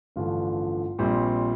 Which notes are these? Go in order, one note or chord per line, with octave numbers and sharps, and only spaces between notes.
A1 G2 D3 F3 F4
A#1 A#2 G3 C4